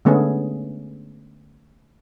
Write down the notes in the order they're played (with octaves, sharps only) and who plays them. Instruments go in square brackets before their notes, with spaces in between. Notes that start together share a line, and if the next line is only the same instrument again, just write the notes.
[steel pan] D3 G#3 A3 B3 C#4 G#4